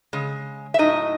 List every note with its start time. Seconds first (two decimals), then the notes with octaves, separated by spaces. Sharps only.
0.13 C#3 G#3
0.74 E5
0.79 A2 F#3 D#4 D#5